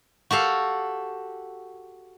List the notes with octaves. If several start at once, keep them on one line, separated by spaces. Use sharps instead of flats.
F#4 G4 A4 F5